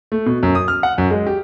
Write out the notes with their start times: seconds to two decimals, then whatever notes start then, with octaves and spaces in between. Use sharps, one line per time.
0.12 A3
0.26 B2
0.43 F#2
0.55 D#6
0.68 F6
0.83 F#5
0.98 F#2
1.11 G#3
1.27 G4